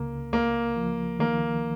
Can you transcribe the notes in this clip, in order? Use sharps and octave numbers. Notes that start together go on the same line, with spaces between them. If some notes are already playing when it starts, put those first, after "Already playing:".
Already playing: C#2 C#3 A#3
C#2 A#3
F3
D#3 A#3